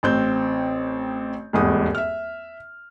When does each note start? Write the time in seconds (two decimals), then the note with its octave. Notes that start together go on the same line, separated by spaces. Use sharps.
0.03 A1 C4 G6
1.53 D#1 G#1 E2 D#6
1.95 E5 F6